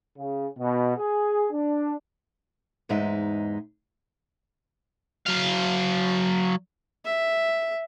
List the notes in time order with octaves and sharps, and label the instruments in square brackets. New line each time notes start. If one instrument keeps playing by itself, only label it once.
[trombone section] C#3
B2
G#4
D4
[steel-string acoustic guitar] E2 G#2 G#3 D#4 E5
[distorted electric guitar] F#3 F5
[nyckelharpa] E5